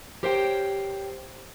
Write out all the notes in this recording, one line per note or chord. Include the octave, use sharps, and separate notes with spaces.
G4 A#4 C5 C#5 F5 G5